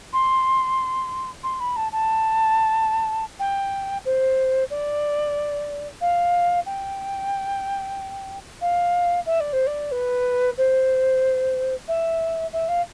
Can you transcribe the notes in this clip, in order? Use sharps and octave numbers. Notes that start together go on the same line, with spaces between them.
C6
C6
B5
A5
A5
G5
C5
D5
F5
G5
F5
E5
D5
C5
D5
B4
C5
E5
E5
F5